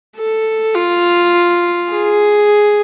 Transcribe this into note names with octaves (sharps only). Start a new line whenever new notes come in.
A4
F4
G#4